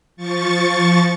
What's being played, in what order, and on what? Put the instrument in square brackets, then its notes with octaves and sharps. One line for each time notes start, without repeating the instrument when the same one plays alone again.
[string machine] F3 C#6 A6